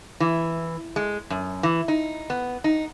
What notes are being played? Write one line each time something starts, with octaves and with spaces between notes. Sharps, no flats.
E3
G#3
F#2
E3
D#4
B3
D#4